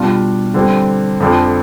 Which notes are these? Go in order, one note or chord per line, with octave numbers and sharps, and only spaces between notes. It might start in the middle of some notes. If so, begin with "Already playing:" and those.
Already playing: B2 G3 D4 F4
D3 G3 C4
F2 D3 F3